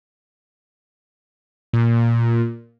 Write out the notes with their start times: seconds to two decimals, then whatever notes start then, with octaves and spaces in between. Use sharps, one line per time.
1.73 A#2